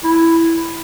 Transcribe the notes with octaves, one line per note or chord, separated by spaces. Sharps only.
E4